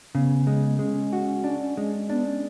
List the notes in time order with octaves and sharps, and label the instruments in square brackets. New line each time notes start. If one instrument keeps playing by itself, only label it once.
[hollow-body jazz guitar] C#3 [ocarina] B3
[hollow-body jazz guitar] G#3
[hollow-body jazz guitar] G#3 [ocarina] C#4
[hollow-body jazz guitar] F#4
D4
G#3
[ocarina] B3 [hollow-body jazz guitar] D4
[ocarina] C#4